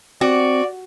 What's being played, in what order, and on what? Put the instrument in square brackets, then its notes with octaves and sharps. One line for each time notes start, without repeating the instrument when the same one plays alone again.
[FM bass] C4 [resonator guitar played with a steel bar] F#4 [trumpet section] D5